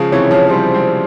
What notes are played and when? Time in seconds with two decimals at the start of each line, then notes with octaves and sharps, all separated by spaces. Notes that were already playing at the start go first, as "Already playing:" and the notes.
Already playing: C#3 F3 G#3
0.12 C3 E3 C#5
0.31 C#3 F3
0.49 E3 G3 C5
0.74 G#3 C4